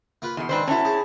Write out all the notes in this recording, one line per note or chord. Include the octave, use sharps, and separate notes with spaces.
A#3 F4 B4
E2 B2 C6
G#2 D#3 C4 D4 B4 C5
A#3 C#4 E4 F#4 A5
G#4 C5